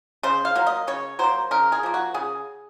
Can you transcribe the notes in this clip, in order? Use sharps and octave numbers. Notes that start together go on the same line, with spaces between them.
C#3 C5
F5
F#3 A#3
D#5
C#3 C#5
F#3 A#3 C5
C#3 A#4
G#4
F3 A#3
F#4
C#3 G#4